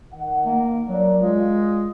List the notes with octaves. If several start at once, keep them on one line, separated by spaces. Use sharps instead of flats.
D#3 F#5
A#3
F#3 D4 A#4 D5
G#3 F4